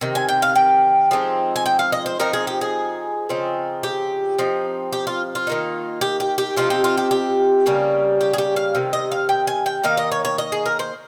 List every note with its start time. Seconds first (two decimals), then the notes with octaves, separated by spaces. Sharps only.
0.01 C3 D#3
0.15 G#5
0.29 G5
0.42 F5
0.56 G5
1.11 F3 G#3 C4 D#4
1.56 G#5
1.66 G5
1.79 F5
1.92 D#5
2.06 C5
2.19 F3 C4 D#4 A#4
2.33 G#4
2.47 G4
2.61 G#4
3.29 C#3 F3 C4 D#4
3.83 G4
4.39 F3 C4 D#4
4.93 G4
5.07 F4
5.35 F4
5.47 D#3 A#3 D#4
6.01 G4
6.20 G4
6.38 G4
6.56 C3 F3 C4 D#4 F4
6.70 G4
6.84 F4
6.97 G4
7.11 G4
7.66 C#3 G3 A#3 C#4
8.21 G4
8.33 G#4
8.38 G4
8.56 F5
8.75 C3 D#3
8.93 D#5
9.12 F5
9.29 G5
9.47 G#5
9.66 G5
9.84 D#3 A#3 D#4 F5
9.97 D#5
10.12 C#5
10.25 C#5
10.38 D#5
10.52 G#4
10.66 A#4
10.79 C5